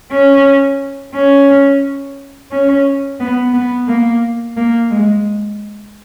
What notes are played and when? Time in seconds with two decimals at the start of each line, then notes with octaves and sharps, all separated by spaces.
0.11 C#4
1.14 C#4
2.51 C#4
3.20 B3
3.54 B3
3.88 A#3
4.57 A#3
4.91 G#3